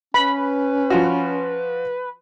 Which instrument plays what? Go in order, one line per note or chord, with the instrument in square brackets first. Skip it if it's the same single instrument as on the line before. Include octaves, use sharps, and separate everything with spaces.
[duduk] C#4 [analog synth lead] B4 [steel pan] B5
[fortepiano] F3 F4 F#4